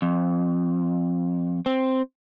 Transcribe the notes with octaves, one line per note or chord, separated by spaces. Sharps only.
F2
C4